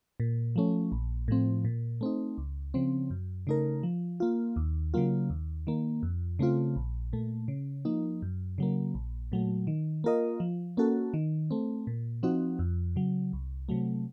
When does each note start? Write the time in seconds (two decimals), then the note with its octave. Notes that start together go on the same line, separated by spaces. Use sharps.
0.20 A#2
0.56 F3 A3 C#4
0.92 A#1
1.28 A2 F3 C4
1.65 A#2
2.01 A3 C4 D#4
2.38 C#2
2.74 C#3 F3 C4
3.10 F#2
3.47 C#3 A3 D#4 A#4
3.83 F3
4.20 A#3 F4
4.56 D#2
4.94 C#3 F#3 A#3 F4
5.30 D#2
5.67 D#3 A#3
6.03 F2
6.39 C#3 A3 C4 F4
6.76 A#1
7.13 A#2 A3
7.48 C#3
7.85 F3 A#3 D#4
8.22 F#2
8.58 C#3 F#3 A#3
8.95 A#1
9.32 A#2 F#3 A3
9.67 D#3
10.04 A#3 F4 A#4 D#5
10.40 F3
10.77 A#3 C#4 F#4 A4
11.14 D#3
11.51 A3 C4
11.87 A#2
12.23 F3 C4 D#4 F#4
12.59 F2
12.96 C#3 F#3
13.33 C2
13.69 C3 F#3 A3